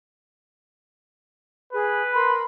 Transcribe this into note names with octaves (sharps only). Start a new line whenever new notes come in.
G#4 B4
A#4 B5 C6